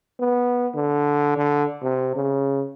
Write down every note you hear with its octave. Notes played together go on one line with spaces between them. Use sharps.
B3
D3
D3
C3
C#3